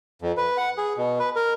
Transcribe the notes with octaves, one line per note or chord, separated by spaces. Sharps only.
F2
B4
F#5
G#4
B2
B4
A#4